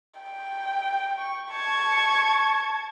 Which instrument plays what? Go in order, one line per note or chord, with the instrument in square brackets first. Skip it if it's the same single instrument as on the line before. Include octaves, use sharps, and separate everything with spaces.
[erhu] G5
[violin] C#6
[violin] A5 G#6 [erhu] C#6